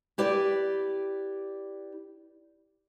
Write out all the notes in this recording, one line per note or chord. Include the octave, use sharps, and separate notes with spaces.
E4 G4 B4 D5